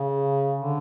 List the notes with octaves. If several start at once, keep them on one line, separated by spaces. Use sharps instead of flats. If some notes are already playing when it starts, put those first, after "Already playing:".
Already playing: C#3
D3